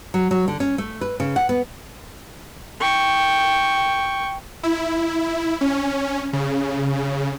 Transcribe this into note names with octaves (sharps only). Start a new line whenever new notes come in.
F#3
F#3
D3
C#4
A3
B4
C#3
F#5
B3
G5 C#6
E4
C#4
C#3